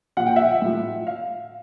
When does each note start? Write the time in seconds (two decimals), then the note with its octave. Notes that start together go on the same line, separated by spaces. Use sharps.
0.17 A#2 F3 F#5
0.27 G5
0.36 E5 F#5
0.62 A2 F3
1.07 F5